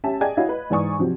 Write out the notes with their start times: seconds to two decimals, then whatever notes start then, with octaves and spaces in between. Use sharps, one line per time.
0.04 C#4 G4 E5 G#5 A5
0.21 G#4 D5 D#5 G5 G#5 G#6
0.37 E4 F#4 C#5 D#5 F5
0.49 B4 D#5
0.70 G#2 E3 D5 G#5 C#6 D#6
0.99 C3 F3 F#3 C4